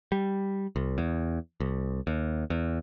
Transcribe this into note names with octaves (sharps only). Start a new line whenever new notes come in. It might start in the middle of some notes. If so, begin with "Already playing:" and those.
G3
C2
E2
C2
D#2
E2